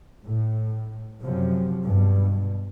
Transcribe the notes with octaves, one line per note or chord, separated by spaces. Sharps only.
A2
F#2 C3 F3 F#3
G2 B2